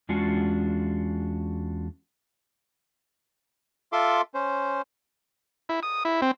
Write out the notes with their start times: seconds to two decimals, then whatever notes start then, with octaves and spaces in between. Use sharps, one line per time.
0.09 E2 G#3 C#4 D4 F4 F#4
3.92 F4 A4 E5 C6 D6
4.34 C#4 C5
5.69 E4
5.83 D#6
6.05 E4
6.22 C4